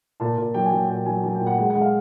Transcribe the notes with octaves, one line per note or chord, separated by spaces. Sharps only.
A#2 A5
A#2
F#3 G5
G#5
F#3
G5
A#2 G5
F#3 G#5
F#3 G#5
G5
A#2
F#5
G#3 F#5
F#5
G#3
F5